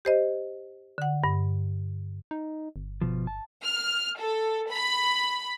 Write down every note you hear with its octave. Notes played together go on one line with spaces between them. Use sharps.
G4 C5 D#5
D3 F#5
G2
D#4
G1
B2 F3
A5
F6
A4
B5